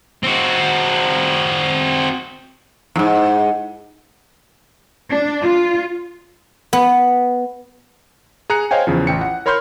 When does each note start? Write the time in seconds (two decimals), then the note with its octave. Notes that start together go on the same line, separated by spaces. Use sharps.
0.23 C4 F#4
2.96 E2 G#2
5.10 D4
5.43 F4
6.73 B3
8.50 G#4 A#5 F#6 C#7
8.71 C5 C#5 D#5 F5 G5 G#5
8.87 E2 C#3 F3
9.07 A1 G5 C#7
9.21 F#5
9.46 A#4 C#5 B5 C6 F6 G6